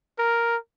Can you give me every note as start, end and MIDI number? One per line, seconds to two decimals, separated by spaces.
0.18 0.56 70